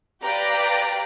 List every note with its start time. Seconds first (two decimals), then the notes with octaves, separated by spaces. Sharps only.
0.22 G4 B4 D5 F5 G5 A#5